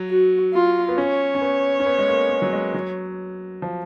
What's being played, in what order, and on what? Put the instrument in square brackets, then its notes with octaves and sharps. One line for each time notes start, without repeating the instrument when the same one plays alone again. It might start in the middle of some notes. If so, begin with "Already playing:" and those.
Already playing: [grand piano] F#3
[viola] F#4
F4
[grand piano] B3
[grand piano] C#4 [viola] C#5
[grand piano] C#4
B3
C#4
B3
G#3
A#3
A#3
F#3
G#3
F#3
F3